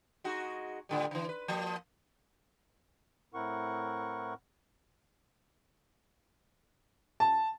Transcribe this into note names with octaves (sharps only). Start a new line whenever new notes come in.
G#3 D#4 F#4
A2 D3 G3
D3 E3
B4
F3 A#3
A2 C4 E4 A#4 F#5 C#6
A5